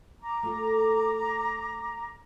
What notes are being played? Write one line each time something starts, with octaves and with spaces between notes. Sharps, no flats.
A#5 D6
A3 F4 A4